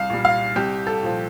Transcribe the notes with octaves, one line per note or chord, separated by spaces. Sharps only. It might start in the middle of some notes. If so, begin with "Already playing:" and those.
Already playing: C2 F5
A#2 G3
F5
C2 G4
A4
A#2 F3